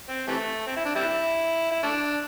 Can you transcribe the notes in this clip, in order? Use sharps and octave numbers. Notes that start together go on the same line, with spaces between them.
C4
C3 E3 A3
C4
E4
D4
G3 C4 E4
E4
A3 D4